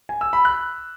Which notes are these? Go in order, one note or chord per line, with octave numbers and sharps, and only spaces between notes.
G#5
E6
B5
F#6